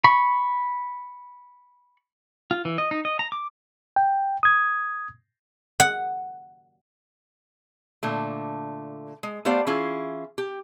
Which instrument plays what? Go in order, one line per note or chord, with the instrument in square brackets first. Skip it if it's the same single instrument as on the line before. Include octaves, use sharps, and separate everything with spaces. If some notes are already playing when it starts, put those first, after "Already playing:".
[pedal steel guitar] B5 C#6
F4
E3
D#5
D#4
D#5
A#5
D6
[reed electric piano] G5
D#6 G#6
[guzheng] F#5
[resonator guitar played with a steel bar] A#2 D3 A3
G#3
A3 B3 G4 C5 D5 F5
E3 C#4 E4 F4 G#4
G4